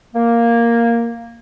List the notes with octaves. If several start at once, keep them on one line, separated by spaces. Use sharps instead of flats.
A#3